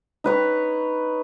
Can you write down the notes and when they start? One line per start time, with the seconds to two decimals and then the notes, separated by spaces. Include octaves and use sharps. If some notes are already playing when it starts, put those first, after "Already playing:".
0.24 D#4 B4 C#5